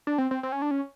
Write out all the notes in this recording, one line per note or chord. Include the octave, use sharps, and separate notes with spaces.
D4
C4
C4
C4
C#4
D4
C#4